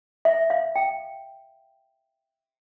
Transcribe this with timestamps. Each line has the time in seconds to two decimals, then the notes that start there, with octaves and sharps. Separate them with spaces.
0.25 E5
0.50 F5
0.76 G5